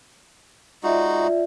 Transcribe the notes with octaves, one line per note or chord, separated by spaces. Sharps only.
G#3 D#4 F4 F#4 D5 E5